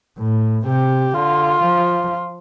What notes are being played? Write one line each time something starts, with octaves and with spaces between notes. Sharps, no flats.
A2
C3 G4
D3 F4
F3